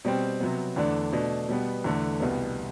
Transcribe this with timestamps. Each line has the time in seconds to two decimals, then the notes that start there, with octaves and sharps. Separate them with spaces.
0.05 B2 G3 C4
0.40 C3 F#3 B3
0.76 E2 D3 A3 D4
1.12 B2 A3 D4
1.49 B2 G3 B3
1.84 E2 D3 A3
2.20 C2 B2 G3 B3